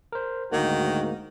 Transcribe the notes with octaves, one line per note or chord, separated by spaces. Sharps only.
A#4 C5
D2 G#2 D#3 A#3 F#4